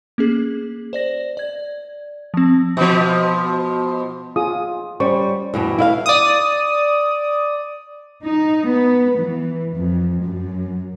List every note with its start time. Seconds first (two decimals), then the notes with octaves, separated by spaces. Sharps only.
0.18 A#3 C#4 G#4
0.93 C5 D5 A#6
1.37 D5 G#6
2.34 F3 C4
2.77 B2 F3
4.36 F4 G#4 D#6
5.00 G3 C#4 C5 C#6
5.54 E2 G2 B2
5.78 E4 E5 F5
6.06 D5 D#6
8.23 D#4
8.66 B3
9.17 E3
9.73 F2
10.21 F#2